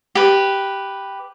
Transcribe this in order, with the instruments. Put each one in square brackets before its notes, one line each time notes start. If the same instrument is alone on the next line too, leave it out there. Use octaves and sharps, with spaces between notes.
[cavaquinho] G4 B4